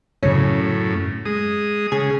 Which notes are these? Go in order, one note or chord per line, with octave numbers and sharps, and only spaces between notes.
F#2 A2 C#3 C#4
G#3 D#6
C#3 G#4